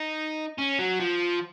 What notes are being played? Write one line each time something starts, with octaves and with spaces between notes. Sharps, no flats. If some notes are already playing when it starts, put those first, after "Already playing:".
Already playing: D#4
C#4
F#3
F3